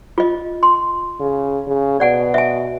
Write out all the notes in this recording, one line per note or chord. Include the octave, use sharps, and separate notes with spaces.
F4 D#5
C6
C#3
C#3
B2 D5 F#5 G#5
E5 G#5